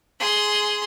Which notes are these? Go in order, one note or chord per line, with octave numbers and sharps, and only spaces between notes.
G#4 C6